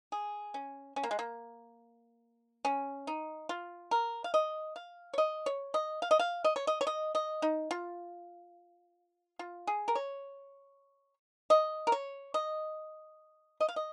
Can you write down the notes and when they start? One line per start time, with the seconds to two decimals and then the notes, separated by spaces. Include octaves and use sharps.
0.12 G#4
0.54 C#4
0.96 C#4
1.03 A#3
1.11 G#3
1.19 A#3
2.65 C#4
3.07 D#4
3.49 F4
3.91 A#4
4.24 F5
4.34 D#5
4.76 F5
5.14 C#5
5.18 D#5
5.46 C#5
5.74 D#5
6.02 F5
6.11 D#5
6.19 F5
6.44 D#5
6.56 C#5
6.67 D#5
6.81 C#5
6.87 D#5
7.15 D#5
7.42 D#4
7.71 F4
9.39 F4
9.67 G#4
9.88 A#4
9.95 C#5
11.50 D#5
11.87 A#4
11.92 C#5
12.34 D#5
13.61 D#5
13.69 F5
13.76 D#5